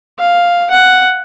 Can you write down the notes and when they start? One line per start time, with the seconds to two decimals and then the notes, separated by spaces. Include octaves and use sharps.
0.19 F5
0.70 F#5